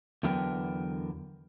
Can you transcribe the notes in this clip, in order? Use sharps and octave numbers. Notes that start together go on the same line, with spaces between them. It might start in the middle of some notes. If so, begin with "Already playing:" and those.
E2 D3 F#3 B3 A#4 G5